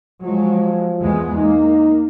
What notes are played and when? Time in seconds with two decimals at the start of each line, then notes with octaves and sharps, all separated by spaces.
0.22 F3 F#3 G#3
1.02 E2 G#3 B3
1.37 A#3 D#4